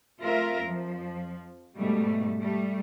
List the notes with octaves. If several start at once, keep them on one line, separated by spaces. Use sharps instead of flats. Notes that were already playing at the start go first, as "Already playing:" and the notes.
A3 C4 F4 A#4 E5
F2 F3
G#2 B2 G3 A3
G3 A3